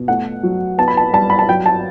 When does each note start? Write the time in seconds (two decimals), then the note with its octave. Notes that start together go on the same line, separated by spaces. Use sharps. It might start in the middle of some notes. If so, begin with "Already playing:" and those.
Already playing: B2
0.08 A3 F#5
0.43 F#3
0.78 B3 A5
0.88 B5
0.97 A5
1.13 G3 A5
1.30 B5
1.39 A5
1.49 F#3 G5
1.66 A5